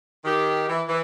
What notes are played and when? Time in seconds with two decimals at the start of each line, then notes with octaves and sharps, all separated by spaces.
0.25 D#3 G4
0.69 E3
0.88 E3